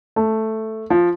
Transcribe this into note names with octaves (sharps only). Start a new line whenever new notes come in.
A3
F3